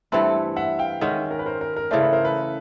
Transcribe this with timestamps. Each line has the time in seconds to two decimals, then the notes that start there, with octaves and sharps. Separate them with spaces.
0.12 G2 E3 A3 C4 A4 B4
0.56 E5 F#5
0.79 F5 G5
1.01 D#3 G#3 C#4 E5 F#5
1.31 A#4
1.39 B4
1.46 A#4 C5
1.61 A#4
1.76 A#4
1.91 C#3 E3 A3 C5 D5
2.02 A4 B4
2.13 A#4 C5
2.24 A4 B4